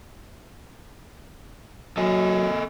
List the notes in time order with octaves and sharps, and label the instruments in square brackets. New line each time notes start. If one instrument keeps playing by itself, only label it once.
[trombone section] F#3 [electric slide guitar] A4 D#5 G#5